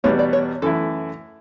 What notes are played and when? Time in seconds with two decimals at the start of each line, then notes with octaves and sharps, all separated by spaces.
0.04 E2 B2 G3 B3 C#5
0.19 D5
0.33 C#5
0.62 F#2 E3 A3 E4 A4